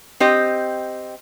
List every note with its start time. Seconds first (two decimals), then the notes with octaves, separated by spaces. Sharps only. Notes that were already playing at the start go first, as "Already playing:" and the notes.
0.20 C4 G4 D#5